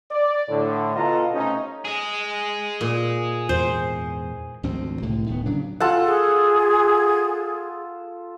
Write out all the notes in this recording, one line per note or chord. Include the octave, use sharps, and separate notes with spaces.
D5
A2 D3
B2 F4 A4 D#5 F5 A#5
C3 A3 C#4 D#4
G#4 D#5
A#2
E2 G#2 C5
G#1 D2 F3 C4
C2 A2 D3
D1 D#3 B3
C#3 F#3 D4
F4 A4 F#5
G#4